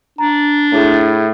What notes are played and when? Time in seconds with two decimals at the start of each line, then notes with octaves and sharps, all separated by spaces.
0.18 D4 A#5
0.72 A2 E4 G#4